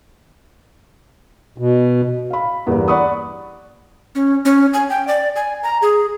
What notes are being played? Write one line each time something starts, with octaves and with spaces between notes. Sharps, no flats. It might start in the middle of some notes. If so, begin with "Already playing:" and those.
B2
F5 B5
E2 G2 A#3 B3
D5 F#5 B5 C#6 D#6
C#4
C#4
G#5
G5
D5
G#5
A#5
G#4